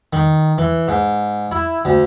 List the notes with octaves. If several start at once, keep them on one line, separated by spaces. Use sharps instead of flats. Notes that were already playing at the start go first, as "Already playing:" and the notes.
D#3
E3
G#2
E4
D2